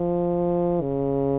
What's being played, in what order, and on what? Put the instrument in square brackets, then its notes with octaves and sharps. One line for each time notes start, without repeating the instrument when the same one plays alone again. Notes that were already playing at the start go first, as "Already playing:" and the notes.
Already playing: [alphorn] F3
C#3